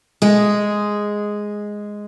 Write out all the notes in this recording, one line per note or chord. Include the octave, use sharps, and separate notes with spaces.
G#3 G#4